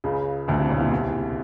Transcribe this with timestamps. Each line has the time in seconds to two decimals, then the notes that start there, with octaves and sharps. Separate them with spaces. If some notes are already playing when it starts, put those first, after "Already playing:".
0.04 C#2 C#3
0.48 D2 D3
0.59 C2 C3
0.69 B1 B2
0.80 A#2
0.91 C2 C3